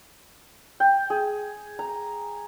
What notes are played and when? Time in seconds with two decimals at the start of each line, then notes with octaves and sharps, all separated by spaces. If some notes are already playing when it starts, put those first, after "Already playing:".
0.80 G5
1.10 G#4
1.79 A#5